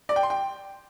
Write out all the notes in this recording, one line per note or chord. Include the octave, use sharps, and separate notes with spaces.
D5
G5
C6
G5